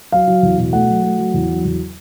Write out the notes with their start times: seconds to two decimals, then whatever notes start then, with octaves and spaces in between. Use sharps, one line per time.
0.12 F#3 F5
0.27 F#3
0.43 E2
0.58 B2
0.73 A3 F#5
0.88 F#3
1.03 A3
1.18 F#3
1.34 E2
1.49 F#3
1.64 E2